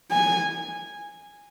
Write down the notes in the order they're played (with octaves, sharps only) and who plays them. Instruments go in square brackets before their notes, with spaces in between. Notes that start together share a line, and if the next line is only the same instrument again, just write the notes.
[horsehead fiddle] G#5